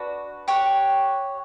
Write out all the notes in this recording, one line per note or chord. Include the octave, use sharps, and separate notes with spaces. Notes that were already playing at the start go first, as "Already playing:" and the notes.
Already playing: D4 F#4 B4
G4 C#5 F#5